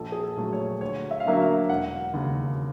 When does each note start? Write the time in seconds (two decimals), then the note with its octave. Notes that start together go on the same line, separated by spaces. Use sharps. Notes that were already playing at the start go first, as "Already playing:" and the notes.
Already playing: A#1 A4
0.12 G#4
0.23 A4
0.37 A#2 F#3 A3
0.53 C#5
0.81 D2 C#5
1.11 E5
1.20 F5
1.25 D3 F#3 A#3 C#4 E5
1.40 F5
1.69 E1 F#5
2.13 D#2 C#3